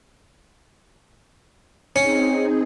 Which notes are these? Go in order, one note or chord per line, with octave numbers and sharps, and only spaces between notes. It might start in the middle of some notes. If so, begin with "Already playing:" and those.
C4 C#4 D#4 G#4